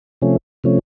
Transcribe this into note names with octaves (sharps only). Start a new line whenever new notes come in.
C3 F3 A3 C#4
C3 F3 A3 C#4